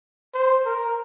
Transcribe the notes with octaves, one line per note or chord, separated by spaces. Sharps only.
C5
A#4